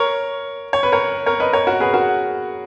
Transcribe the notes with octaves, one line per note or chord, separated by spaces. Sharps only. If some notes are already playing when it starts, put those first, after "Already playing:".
Already playing: A#4 C#5
C#5
B4
A#4 C#5
A#4 C#5
B4 D#5
A#4 C#5
F#4 A#4
G#4 B4
F#4 A#4